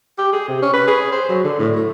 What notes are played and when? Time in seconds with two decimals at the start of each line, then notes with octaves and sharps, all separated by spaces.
0.18 G4
0.33 G#4
0.48 C3
0.62 C#4
0.74 B4
0.88 G#4
1.12 C5
1.29 F#3
1.44 D3
1.59 A2
1.76 A3